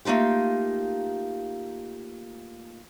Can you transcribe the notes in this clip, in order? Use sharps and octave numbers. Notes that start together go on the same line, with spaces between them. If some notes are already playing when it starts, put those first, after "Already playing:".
A3 A#3 D#4 F4 G4